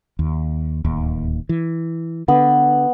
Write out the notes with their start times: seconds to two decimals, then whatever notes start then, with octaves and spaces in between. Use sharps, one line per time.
0.19 D#2
0.85 D1 D#2
1.49 E3
2.28 D3 B3